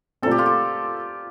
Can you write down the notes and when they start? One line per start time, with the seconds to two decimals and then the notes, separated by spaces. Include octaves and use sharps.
0.22 A#2 A3 C4 A4
0.31 G4
0.38 F4
0.46 G4